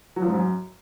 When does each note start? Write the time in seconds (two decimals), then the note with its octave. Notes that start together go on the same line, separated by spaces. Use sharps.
0.16 F#3
0.22 F3
0.28 G#2
0.34 F#2